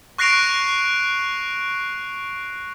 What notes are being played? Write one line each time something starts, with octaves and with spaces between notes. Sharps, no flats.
C#6 F#6 A#6 C7 D7 F7